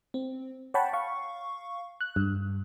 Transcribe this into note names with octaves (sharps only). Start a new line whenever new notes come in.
C4
C#5 F#5 G5 A5 B5 C#6
F5 C#6
F#6
G2